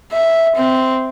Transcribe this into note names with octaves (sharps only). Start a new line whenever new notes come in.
E5
C4